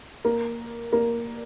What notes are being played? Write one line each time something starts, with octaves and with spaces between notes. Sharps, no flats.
A#3
A#3